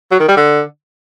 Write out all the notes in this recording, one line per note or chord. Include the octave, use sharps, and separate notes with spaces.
F#3
D#3
G3
D3